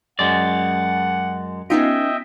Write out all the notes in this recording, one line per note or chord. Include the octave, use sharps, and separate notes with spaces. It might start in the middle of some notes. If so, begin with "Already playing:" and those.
F#2 G#3 D5 F#5
B3 C#4 D#4 F4 D#5 E5 G5